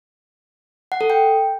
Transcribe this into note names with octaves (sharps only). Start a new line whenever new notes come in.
F#5
A4
G5